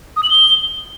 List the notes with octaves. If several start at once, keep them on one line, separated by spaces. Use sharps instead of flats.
D#6
F#7
G7